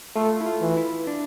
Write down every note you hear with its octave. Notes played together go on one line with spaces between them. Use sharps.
A3 F4
E4
F4
E3
E4
D4